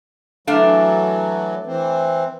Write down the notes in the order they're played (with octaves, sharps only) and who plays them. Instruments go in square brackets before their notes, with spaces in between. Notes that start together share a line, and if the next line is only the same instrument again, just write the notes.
[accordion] E3 F#3 [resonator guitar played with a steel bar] A3 D4 F5
[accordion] E3 C4